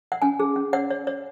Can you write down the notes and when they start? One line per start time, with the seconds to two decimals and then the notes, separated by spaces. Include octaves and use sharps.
0.12 F#5
0.22 C#4 G#5
0.40 G#4
0.56 C#4
0.73 C#5 F#5
0.90 C#5
1.07 C#5